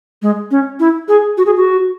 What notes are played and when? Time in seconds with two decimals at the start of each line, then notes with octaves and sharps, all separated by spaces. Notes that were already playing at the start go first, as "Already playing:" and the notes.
0.22 G#3
0.51 C#4
0.80 E4
1.08 G#4
1.38 F#4
1.46 G#4
1.57 F#4